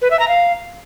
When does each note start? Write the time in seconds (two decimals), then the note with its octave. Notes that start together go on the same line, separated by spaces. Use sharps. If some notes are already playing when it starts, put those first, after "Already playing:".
0.02 B4
0.10 E5
0.19 A#5
0.28 F5